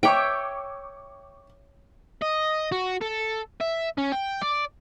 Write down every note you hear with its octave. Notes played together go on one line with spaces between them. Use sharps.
C#5 E5 G5 C#6 D6 D7
D#5
F#4
A4
E5
C#4
G5
D5